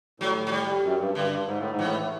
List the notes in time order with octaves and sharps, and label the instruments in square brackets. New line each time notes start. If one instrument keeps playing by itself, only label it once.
[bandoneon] A2 [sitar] F#3
[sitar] F#3
G3
[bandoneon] F#2
G2
[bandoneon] G2 [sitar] D3
[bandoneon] G2
G#2
A2
G#2
[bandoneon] A2 [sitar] E3